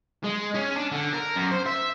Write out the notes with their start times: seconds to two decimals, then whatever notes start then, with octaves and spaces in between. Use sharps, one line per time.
0.24 G#3
0.55 C#4
0.76 D4
0.92 D3
1.13 A#4
1.36 F#2
1.51 C5
1.66 E5